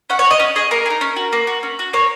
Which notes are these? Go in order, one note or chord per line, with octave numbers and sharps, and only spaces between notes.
C#4 F#5
C#5
F#4
D#5
C#4
G#4 D#5
A#3 A#4
G#4
D#4
C#4
F#4
A#3
F#4
C#4
F#4
A#3 C#5